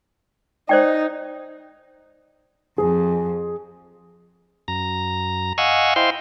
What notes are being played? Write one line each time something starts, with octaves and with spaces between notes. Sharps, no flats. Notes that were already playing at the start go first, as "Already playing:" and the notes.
D#4 C5 D5 G5
F2 G#4
F#2 A#5
D#5 F5 F#5 G#5 C#6 E6
E4 C5 D#5 F5 G5 C6